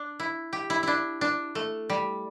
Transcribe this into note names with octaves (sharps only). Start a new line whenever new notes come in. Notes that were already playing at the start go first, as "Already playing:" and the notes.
Already playing: D4
E4
G4
E4
D4 E4
D4
A3
G3